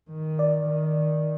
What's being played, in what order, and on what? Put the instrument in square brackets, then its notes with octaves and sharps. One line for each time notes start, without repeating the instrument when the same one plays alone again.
[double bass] D#3
[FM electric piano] D5
[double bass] D#3